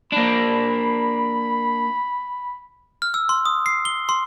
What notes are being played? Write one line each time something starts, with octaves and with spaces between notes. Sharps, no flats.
A#3 D4 B5
F6
E6
C6
D#6
C7
G7
C6